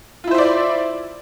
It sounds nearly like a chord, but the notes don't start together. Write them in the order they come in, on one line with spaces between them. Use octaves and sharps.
F4 E4 C5 E5 D5